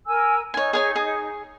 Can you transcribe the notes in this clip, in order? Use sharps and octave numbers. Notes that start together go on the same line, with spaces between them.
A#4 G#5 E6
D#4 C#5 G#5
G#4 C#5 G#5
G#4